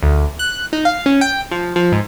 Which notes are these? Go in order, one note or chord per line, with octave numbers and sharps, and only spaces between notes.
D2
F#6
D#4
F5
C#4
G5
F3
F3
G#2